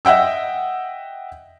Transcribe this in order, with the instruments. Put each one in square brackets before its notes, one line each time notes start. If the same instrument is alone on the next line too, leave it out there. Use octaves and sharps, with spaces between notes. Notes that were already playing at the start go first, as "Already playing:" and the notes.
[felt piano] D#5 E5 F#5 G5 E6